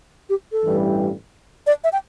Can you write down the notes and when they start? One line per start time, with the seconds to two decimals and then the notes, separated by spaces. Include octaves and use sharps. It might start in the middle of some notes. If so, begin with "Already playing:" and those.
0.29 G4
0.52 A4
0.64 A1 G2 E3 G3
1.67 D5
1.84 E5
1.93 G5